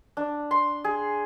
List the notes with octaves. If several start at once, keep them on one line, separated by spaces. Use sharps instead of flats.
D4
C6
G#4